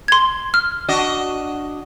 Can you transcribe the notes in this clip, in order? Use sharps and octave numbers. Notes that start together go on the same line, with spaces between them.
C6 G#6
F6
D4 F#4 D#5